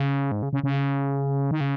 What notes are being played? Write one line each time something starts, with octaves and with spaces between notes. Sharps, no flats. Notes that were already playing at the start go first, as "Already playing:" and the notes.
Already playing: C#3
G#2
C#3
C#3
C#3
D#3
C#3